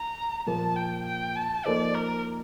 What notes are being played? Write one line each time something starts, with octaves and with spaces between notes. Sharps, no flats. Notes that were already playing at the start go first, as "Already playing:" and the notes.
Already playing: A#5
A#2 F3 A#3 A5
G5
G5
A5
F3 A#3 D#4 A4 C5 D5
A#4